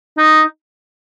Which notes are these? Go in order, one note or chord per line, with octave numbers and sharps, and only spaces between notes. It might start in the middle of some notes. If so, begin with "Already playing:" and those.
D#4